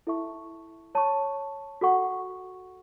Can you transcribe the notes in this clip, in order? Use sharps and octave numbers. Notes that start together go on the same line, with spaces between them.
E4 A4 E5 A5 C#6
C#5 A5 C#6
F#4 A4 F#5 C#6